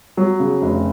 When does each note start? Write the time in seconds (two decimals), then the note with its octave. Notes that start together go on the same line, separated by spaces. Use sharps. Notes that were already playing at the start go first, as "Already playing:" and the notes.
0.17 F#3
0.40 C#3
0.62 F1